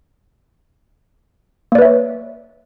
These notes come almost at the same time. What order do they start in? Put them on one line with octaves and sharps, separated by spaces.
A#3 D5 B4 E5 C#5